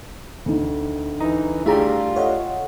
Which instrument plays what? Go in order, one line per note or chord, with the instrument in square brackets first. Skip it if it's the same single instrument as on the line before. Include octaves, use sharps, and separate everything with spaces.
[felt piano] D2 D#3
[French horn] E3 [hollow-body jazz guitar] D#4 [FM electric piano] A#5
[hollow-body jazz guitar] A3 D4 G4 [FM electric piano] E4 G#4 A#5 [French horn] F4
[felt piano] A4 D#5 E5 [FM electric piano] C#5 F#5